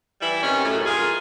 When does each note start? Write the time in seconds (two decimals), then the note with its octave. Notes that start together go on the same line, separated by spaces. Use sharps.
0.21 E3 G3 E4
0.43 C3 D#3 C#4
0.65 F#2 A2
0.85 F4 G#4 A#4